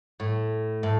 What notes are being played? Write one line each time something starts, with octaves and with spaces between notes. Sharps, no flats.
A2
A2